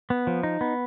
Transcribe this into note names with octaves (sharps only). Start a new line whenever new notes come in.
B3
F3
D#4
B3